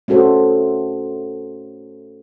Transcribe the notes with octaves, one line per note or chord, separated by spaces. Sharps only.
A3 C#4 F#4 A4 C5